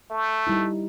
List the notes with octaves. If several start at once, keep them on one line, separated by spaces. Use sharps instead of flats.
A3
G3 D#4 E4